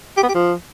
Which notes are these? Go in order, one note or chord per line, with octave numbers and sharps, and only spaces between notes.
G4
B3
G4
F3